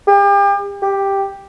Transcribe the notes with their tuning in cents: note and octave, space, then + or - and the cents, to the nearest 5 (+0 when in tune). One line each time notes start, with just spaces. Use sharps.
G4 +40
G4 +5